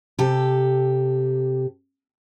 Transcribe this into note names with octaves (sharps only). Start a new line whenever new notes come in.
C3 G4 A4